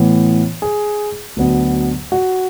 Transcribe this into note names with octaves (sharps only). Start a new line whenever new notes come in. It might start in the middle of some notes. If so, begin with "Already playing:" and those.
Already playing: A2 E3 B3
G#4
D2 D3 F#3 B3
F#4